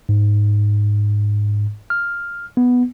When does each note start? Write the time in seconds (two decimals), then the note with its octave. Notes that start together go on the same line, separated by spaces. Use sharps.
0.09 G#2
1.90 F6
2.57 B3